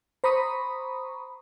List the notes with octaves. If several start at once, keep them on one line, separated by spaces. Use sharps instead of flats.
C5 A#5 B5 C#6 D#6